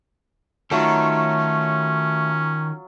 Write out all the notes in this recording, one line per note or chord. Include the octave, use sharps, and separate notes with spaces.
D#3 F#3 A3 C#4 F4 A4